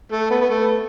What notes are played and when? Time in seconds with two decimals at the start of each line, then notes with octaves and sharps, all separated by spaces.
0.12 A3
0.31 B3
0.41 B3
0.50 A3